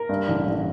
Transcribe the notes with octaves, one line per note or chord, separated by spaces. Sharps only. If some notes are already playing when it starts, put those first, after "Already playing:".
Already playing: A#4
G2
A1
A1